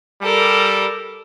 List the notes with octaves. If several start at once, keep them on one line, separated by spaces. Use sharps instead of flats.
G3 A4 A#4